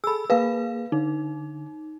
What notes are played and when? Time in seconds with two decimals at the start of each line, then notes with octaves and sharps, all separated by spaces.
0.04 G#4 A4 B5 E6
0.30 A#3 G#4 B4 F5
0.92 D3 D#4